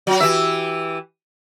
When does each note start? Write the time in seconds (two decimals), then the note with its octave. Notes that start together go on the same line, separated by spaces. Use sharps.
0.07 F#3 F#4
0.20 E3 G4 E5